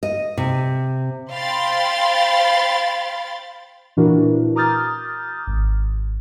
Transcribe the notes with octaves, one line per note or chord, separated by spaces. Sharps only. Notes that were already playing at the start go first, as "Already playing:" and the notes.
D#5
C3
C5 F5 G5 B5 C6 A6
A#2 E3 D4 E4 F#4 A#4
A#5 D6 D#6 F6 G6 A6
G#1